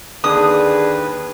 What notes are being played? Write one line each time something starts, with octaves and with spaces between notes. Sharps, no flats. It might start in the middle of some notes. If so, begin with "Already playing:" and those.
D#2 D3 D#3 D4 G#4 B4 D#6